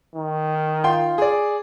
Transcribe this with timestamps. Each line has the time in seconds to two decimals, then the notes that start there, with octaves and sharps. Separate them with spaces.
0.16 D#3
0.84 F4 G5 C6
1.18 G#4 D5